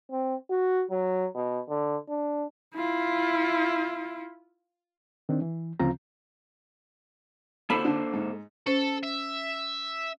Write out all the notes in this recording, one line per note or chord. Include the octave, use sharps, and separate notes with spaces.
C4
F#4
F#3
B2
D3
D4
E4 F4
D#3 C4 D4
E3
D2 C#3 F3 C4 F4 A#5
A#3 A4 C5 B5
D3
G#2
C#4 A4 C5
E5